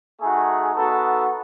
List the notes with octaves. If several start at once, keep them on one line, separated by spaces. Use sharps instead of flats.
A3 D#4 F#4 G#4
B3 D#4 F#4 A4